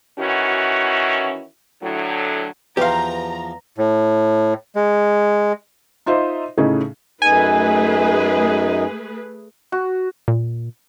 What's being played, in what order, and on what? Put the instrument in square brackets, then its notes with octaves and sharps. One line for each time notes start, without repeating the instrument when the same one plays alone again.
[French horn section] D#3 E3 C#4 E4 F#4
A2 D3 F#3
[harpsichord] E2 F3 [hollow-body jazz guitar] G4 F5 [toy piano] B4 C6 [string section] A#5
[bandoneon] A2
G#3
[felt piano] D#4 F4 C5 D#5 E5
A2 C#3 A3 C#4 D#4 G#4
[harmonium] F#2 D#4 [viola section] A3 G#4 B4 [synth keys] G#5
[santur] F#4
[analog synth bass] A#2